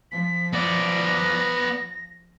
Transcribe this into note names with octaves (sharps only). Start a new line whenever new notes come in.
F3 B6
B3 D5 A#6